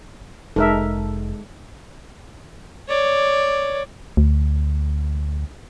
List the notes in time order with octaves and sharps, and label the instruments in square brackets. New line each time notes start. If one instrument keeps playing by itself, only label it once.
[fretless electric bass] F1 [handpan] G#3 A4 [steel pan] D#4 A#4 E5
[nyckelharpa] C#5 D5
[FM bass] D2